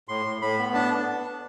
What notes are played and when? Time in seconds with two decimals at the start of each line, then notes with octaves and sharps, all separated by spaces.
0.08 A2 C6
0.26 A2
0.42 A2 B5
0.59 B3
0.74 D4 A5